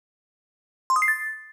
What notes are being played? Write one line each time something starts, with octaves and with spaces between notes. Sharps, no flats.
C6
D#6
C7
A6